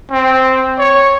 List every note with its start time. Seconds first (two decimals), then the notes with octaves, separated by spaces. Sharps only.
0.11 C4
0.78 C#5